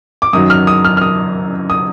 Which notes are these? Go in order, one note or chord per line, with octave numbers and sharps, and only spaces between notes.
D6
F#2 D#3 F#3 D#6
F6
D#6
F6
F6
D#6
D#6